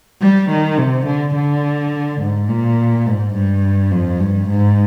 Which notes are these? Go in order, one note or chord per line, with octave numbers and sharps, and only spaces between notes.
G3
D#3
C3
D3
D3
G#2
A#2
G#2
G2
F2
G2
G#2